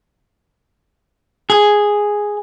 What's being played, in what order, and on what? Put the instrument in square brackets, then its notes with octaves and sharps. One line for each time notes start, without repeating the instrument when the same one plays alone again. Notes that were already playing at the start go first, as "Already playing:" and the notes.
[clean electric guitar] G#4